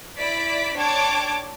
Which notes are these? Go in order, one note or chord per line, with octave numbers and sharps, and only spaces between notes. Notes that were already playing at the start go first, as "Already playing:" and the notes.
E4 D5 B6 D7
D4 C#5 G5 A5 D6 G#6